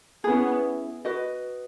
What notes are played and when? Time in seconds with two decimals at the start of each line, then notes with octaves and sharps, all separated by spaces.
0.24 B3 C#4 E4 G#4
1.05 F#4 B4 D#5